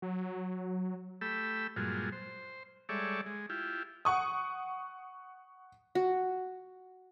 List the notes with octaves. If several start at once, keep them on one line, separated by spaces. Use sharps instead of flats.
F#3
A3 G4 B5 E6
G2 A#2 F#3 G#3 F4
C5
G3 G#3 A4 C#5 D5 E5
G#3
E4 F4 G4
F#5 C#6 D#6
F#4